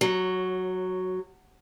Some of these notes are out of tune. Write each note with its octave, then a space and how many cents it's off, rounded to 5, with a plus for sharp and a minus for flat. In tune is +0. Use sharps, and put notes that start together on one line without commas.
F#3 +0 C#5 -20